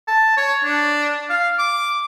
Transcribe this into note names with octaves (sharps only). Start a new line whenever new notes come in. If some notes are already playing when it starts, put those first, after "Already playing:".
A5
C#5
D4
F5
D6